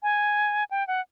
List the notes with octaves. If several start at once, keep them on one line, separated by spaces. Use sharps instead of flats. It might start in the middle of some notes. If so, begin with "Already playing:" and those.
G#5
G5
F#5